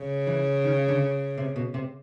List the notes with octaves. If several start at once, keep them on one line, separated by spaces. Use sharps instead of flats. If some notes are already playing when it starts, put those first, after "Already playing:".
Already playing: C#3
E3
D#3
D3
C3
B2
C3